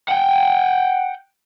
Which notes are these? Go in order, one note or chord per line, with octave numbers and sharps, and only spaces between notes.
F#5 G5